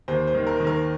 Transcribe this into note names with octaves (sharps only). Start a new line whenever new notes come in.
D#2 C5
C5
D#3
A#4
D#3
A#4